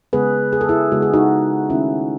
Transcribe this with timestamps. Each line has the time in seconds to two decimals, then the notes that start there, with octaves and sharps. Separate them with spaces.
0.13 C#3 G#3 B3 G#4 B4
0.53 G#4
0.61 A4
0.69 E4 G#4
0.92 C#3 G#3 B3 F#4
1.02 G#4
1.14 D#4 F#4
1.70 D#3 A3 C#4 E4